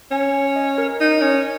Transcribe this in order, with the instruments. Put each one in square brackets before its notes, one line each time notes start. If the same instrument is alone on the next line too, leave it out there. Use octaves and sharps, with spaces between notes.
[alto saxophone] C#4 [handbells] G#5
[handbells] G#5
D#5
A#4
[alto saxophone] D#4
C#4